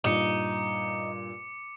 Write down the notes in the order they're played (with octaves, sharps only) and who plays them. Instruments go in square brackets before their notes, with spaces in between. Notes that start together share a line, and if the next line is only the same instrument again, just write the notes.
[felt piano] G2 A#2 [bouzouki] D#4 [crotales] D6 C#7